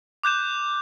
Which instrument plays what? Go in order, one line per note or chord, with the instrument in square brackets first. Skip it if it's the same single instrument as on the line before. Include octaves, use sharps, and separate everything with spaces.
[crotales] D6 F#6 G6 E7